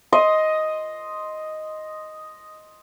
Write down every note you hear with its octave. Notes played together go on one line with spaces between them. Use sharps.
D#5 C6 D#6